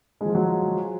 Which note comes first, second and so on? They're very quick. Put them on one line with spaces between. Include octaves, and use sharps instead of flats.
G#3 F3 F4 F#3